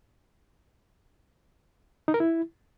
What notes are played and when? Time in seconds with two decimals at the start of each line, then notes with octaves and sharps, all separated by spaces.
2.08 D#4
2.14 A#4
2.20 E4